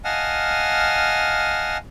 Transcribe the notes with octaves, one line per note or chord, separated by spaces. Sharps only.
D#5 F5 F#5 G#5 A5 F6